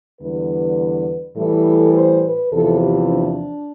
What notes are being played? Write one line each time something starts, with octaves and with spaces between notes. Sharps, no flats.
E2 D3 G3 B4
A2 E3 G3 A4
C5
B4
E2 C3 F3 A4
G4
D4